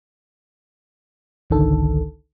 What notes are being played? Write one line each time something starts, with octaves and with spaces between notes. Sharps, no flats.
G#1 C#2 D3 D#3 A4